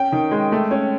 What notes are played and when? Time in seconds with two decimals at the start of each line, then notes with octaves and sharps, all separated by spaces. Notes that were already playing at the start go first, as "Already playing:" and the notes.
Already playing: C#4 G5
0.12 D#3
0.31 G#3
0.52 A3
0.71 C#4